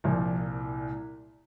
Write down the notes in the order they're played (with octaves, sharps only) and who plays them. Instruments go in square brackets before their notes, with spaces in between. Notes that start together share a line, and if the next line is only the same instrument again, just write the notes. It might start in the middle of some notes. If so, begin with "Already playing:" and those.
[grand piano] C2 A#2 F3